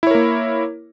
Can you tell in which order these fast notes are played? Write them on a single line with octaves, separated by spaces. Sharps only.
E4 C#5 A#4 A#3